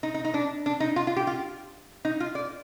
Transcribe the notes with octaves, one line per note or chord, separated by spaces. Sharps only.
D#4
D#4
D#4
D4
D4
D#4
F4
F4
G4
F4
D#4
F4
D5